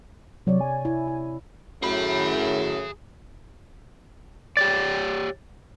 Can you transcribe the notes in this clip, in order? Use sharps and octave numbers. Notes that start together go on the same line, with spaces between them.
C3 F#3 C#5 D5
G#5
E4
E4
F#2 A2 G#4 B5
G4 C#5 D5 A6